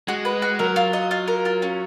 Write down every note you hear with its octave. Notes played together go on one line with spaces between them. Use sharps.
G#3 F#4
B4
F#4
F#3 A#4
F4
D#5
F4
A#4
F4
C#4